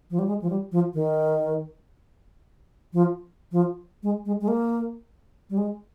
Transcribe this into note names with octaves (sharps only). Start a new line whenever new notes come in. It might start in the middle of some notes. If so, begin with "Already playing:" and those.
F3
G3
G#3
F3
G3
F3
D#3
F3
F3
G#3
G#3
G#3
A#3
G3
G#3